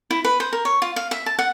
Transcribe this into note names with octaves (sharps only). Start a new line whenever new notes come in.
E4
B4
C5
A#4
C#5
F4
F5
E5
A5
F#5